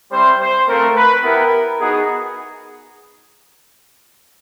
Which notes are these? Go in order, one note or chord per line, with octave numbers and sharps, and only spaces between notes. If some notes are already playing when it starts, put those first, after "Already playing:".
G3 C4 E4 C5
C5
A3 C4 F4 A#4
B4
B3 E4 G4 A#4
B3 D#4 F#4 G#4